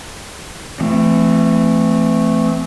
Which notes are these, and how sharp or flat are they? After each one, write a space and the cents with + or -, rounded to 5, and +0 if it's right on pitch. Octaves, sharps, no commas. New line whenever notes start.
E3 +40 A3 +0 C4 -10